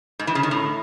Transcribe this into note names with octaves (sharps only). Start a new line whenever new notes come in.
G#2
E3
C#3
D#3
A2